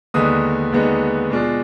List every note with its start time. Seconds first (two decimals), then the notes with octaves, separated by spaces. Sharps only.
0.14 D#2 D3 G#3 B3 D#4 D#6
0.72 D#2 D3 G#3 B3 D#4
1.30 B2 G#3 D4 F4